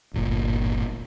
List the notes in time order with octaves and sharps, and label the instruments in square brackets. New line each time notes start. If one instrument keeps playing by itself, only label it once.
[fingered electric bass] D1 G1 A#2